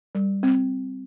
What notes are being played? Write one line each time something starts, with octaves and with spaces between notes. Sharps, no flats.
G3
C4